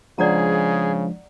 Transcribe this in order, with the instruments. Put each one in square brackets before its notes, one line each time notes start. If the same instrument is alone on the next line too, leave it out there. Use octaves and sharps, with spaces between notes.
[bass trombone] C#3 [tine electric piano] F3 G#3 D4 [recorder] G#4 [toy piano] D5 F#5 A#5